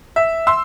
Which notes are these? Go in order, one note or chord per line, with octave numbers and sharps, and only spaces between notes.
E5
C6 E6